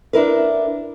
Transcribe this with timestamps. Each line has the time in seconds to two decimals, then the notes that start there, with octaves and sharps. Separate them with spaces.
0.13 D4 E4 A#4 B4